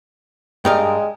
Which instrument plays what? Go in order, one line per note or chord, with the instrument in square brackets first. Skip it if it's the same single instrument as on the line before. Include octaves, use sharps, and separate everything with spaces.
[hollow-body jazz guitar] G2 A#4 F5 [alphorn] G#3 [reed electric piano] G5 D#6